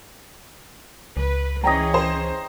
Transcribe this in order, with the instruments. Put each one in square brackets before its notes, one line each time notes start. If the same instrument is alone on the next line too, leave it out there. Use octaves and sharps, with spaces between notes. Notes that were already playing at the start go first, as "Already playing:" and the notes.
[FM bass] C#2 [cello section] B4
[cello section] E3 C#4 G#4 [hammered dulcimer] D#5 G5 A#5
[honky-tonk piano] C5